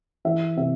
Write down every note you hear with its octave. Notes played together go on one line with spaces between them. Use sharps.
E3 E5
C3 E5